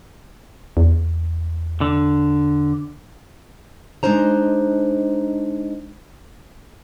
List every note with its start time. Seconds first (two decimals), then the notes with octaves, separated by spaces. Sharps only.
0.77 E2
1.81 D3
4.03 G#3 D4 D#4 C5 A#5